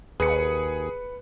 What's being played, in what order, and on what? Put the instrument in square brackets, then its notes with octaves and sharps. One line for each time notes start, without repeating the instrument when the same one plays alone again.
[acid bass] D#2 [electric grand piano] G#4 C#7 [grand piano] B4